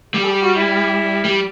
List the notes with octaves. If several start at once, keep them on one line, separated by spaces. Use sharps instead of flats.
G3 G4
A4
G4
F#4
E4
G3